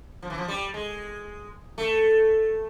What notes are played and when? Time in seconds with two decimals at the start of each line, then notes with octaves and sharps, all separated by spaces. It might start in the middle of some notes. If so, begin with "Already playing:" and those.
0.22 F3
0.30 E3
0.38 F3
0.48 G3
0.74 G#3
1.78 A3